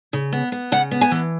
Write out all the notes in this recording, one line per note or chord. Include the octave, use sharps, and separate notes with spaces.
C#3
B3
B3
C#3 F#5
B3
G#5
E3